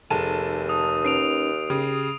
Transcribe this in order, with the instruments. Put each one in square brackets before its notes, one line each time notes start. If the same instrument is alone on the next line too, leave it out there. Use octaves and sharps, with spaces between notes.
[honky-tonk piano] F1 A5 [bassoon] D#2 [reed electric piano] G#4 A4 [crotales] D#7
[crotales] D#6
[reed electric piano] C#4 D#4 B4 [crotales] C7 D7 F7
[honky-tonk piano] C#3 [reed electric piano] G4 D#6